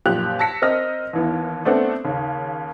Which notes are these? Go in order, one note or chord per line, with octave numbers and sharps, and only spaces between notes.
F#2 A#2 F3 G4 F#6 F7
A5 E6 A#6 B6 C#7
C4 A#4 D#5 F6 A#6
D#2 E3 B3
A3 B3 C4 D4 A4 F#5
D#2 C#3